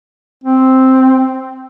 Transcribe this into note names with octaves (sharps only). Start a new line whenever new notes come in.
C4